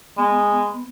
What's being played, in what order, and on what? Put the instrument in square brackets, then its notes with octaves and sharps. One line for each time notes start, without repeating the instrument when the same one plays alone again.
[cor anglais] G#3 [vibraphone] B3